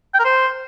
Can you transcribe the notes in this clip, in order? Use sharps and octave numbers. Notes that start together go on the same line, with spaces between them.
G5
A#4
C5